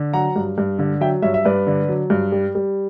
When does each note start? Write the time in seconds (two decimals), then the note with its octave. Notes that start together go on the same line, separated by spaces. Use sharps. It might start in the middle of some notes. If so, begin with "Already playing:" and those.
Already playing: D3
0.13 F#3 F#5 A#5
0.36 G2
0.58 G2
0.79 D3
1.01 F#3 E5 G5
1.22 G2 C#5 E5
1.34 E5
1.45 G2 B4 D5
1.67 D3
1.88 F#3
2.10 G2
2.32 G3
2.55 G3